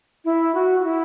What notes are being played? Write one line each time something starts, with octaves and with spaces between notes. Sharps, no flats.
E4
F#4
F#4
E4